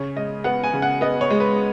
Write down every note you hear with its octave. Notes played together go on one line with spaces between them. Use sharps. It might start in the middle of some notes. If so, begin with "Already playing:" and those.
Already playing: C#3 C#5
G#3 D#5
B3 F#5
G#5
C#3
F#5
B3 D#5
C#5
G#3
B4